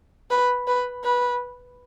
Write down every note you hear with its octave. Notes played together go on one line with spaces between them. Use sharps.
B4
B4
B4